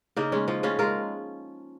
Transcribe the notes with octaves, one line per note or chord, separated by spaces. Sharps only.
C#3 A#3 D#4
G#3 C#4
F3 C#4
C#3 C#4 F4
G#3 F4 A#4